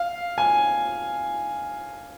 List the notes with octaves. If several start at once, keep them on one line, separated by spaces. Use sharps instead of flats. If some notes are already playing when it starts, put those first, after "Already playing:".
Already playing: F5
G#5